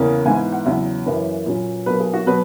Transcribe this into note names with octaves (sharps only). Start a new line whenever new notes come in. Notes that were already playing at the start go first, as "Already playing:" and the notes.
Already playing: E2 C#3 A#3 C#4
G#2 E3 B3 G#5
F#5
E2 C#3 F#3 E5
F#2 E3 A#3 C#4 B4
A#2 F#3 C#4
B2 F#3 A#3 B4
G#4
F#4
B2 F#3 B4